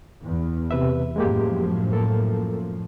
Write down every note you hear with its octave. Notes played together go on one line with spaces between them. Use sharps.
E2
C3 B4 E5
F#2 A2 F3 G#3 A#3 G4
A#3 A4 A#4